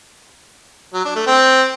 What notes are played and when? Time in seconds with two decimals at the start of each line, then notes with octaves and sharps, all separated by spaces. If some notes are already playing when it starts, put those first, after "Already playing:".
0.94 F#3
1.05 D4
1.16 A3
1.27 C4